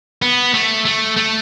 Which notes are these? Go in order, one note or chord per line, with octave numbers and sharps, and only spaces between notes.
B3
A3
A3
A3